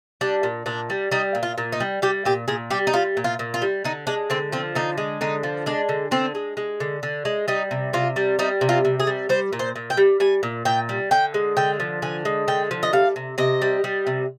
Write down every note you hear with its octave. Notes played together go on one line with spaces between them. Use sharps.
G3 D4
A#2
A#2 D4
G3
G3 D#4
A#2
F4
A#2
D#4
G3
G3 G4
A#2 G4
A#2 G#4
G3 G4
D#4
G3 F4
A#2
F4
A#2
F4
G3
D3 D#4
G#3 D4
D3 C4
F3 C4
D3 D#4
G#3
D3 D#4
F3
G#3 D4
D3
D3 C4
G#3
G#3
D3
D3
G#3
G3 D#4
C3
C3 F4
G3
G3 D#4
C3
F4
C3
G#4
G3
G3 C5
A#2
C5
A#2
G5
G3
G3 G#5
A#2
A#2 G5
G3
D3 G5
G#3
D3 G5
F3
D3 G#5
G#3
D3 G5
F3
D#5
G3 F5
C3
C3 D#5
G3
G3
C3